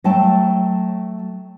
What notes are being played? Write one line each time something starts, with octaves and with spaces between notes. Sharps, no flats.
F#3 A3 G5 A5